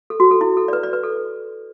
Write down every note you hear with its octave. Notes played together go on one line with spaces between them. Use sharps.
A4
F#4
A4
E4
A4
D5
B4
D5
B4
A4